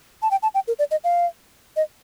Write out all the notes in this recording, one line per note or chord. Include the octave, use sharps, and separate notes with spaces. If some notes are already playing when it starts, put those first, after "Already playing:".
A5
G5
A5
G5
A#4
D5
D#5
F5
D#5